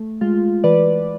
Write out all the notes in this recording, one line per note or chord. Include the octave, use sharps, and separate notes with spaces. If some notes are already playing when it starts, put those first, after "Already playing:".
Already playing: A3
G#3 F4
E3 B4 D5